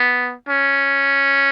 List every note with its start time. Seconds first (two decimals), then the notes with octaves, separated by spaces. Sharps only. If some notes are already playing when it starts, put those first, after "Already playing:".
Already playing: B3
0.49 C#4